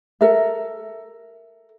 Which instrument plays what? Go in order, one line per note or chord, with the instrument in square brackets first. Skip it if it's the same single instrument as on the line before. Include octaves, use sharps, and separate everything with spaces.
[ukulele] A4 A#4 E5